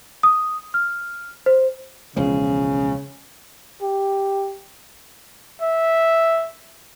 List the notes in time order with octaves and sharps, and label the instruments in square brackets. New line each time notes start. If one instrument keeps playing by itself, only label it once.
[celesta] D#6
F6
C5
[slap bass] E1 C#2 F3 [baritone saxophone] C#3
[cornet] G4
[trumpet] E5